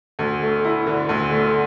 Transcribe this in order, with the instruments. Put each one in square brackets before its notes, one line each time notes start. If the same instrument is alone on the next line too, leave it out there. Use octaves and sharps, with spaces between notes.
[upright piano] D2
A3
E4
D3
D2
A3